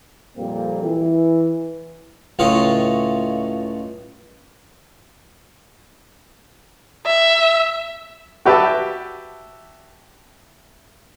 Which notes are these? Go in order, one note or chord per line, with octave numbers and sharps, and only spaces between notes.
F2 A#2 G3 A#3 C4
E3
C#2 A2 F4 C#5 D#5 F5
E5
F#4 G4 B4 E5 G5 A5